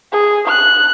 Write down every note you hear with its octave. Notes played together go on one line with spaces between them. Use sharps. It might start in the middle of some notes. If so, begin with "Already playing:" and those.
G#4
F#6